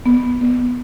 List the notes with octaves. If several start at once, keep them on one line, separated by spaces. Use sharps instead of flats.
B3
B3